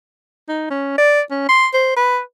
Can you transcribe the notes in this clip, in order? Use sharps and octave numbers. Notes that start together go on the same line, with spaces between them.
D#4
C#4
D5
C#4
C6
C5
B4